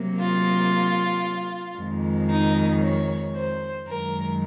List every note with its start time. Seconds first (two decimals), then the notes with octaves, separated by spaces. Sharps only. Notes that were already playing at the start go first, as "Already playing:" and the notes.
Already playing: C3 F#3 A#3
0.19 F4
1.77 F2 D#3 G#3
2.29 D#4
2.82 C#5
3.35 C5
3.87 F#2 D#3 G#3 A#4